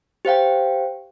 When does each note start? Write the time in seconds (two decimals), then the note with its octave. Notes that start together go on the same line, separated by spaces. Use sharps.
0.25 G4 C5 F5 G5